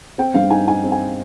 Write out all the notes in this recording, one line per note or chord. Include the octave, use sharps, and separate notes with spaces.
C4 G5
G2 F5
D#4 G#5
D#4 G#5
C4
G#5